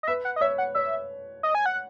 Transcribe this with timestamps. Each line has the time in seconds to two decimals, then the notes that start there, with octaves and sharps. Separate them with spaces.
0.03 D#5
0.08 B4 E5
0.25 F#5
0.36 D#5
0.41 C#5 E5
0.58 F#5
0.75 C#5 E5
1.43 D#5
1.55 G#5
1.66 F#5